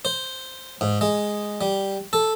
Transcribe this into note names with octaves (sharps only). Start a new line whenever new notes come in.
C5
G#2
G#3
G3
A4